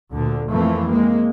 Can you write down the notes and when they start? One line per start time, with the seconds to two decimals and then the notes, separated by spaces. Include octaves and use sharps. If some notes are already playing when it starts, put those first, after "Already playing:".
0.12 D2 A#2 D3
0.49 F2 E3 F3 A3 A#3
0.87 G#3 A#3 C4